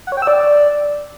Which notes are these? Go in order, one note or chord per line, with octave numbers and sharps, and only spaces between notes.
F#5
C#5
G5
E6
D5